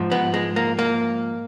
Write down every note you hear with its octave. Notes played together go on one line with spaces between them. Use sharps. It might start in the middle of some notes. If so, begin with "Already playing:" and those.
Already playing: G#2 F3
B3
G#3
A#3
A#3